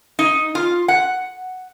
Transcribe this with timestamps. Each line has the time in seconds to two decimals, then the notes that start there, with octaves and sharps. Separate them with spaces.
0.19 D#4
0.55 F4
0.88 F#5